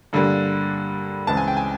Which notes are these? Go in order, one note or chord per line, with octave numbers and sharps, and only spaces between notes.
G2 D3 G3 A#3
C#2 C#3 E3 G#3 C4 A5
G#5
G5
G#5